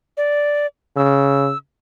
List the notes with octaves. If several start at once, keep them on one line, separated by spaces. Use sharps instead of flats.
D5
C#3 E6